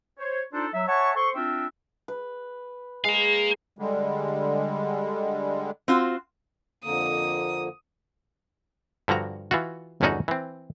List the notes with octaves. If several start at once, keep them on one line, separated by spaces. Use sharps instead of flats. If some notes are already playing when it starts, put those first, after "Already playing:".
C5 C#5
D4 D#4 F4 A4 C5 D5
F#3 E5
C#5 E5 F#5 G#5 A5 C#6
A4 C5 C6 C#6
C4 D4 F4 A#4 E5 G5
B4
G#3 F5 A#5
D3 G3 G#3
C4 F4 F#4
F2 D3 A#3 D#6
G2 D3 F3 F#4 A#5
E3 F4 F#4
G1 E2 D3 C#4 D#4 F#4
E3 C4